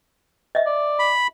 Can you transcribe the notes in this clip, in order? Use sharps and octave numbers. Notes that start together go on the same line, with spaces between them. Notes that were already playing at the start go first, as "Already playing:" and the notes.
D#5 E5
D5
B5